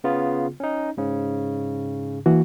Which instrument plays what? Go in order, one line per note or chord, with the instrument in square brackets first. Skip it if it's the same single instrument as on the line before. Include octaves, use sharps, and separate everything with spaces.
[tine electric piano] C#3 B3 F4
C#4 D#4
G#2 C#3
[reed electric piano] E3 A#3 F#4